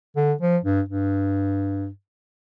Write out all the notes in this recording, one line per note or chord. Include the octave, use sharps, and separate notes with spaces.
D3
F3
G2
G2